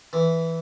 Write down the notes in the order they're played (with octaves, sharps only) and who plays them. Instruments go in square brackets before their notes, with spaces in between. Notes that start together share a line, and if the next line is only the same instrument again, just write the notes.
[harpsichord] E3